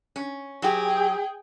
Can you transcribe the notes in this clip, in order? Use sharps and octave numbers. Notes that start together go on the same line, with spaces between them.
C#4
F#3 G4 G#4 G5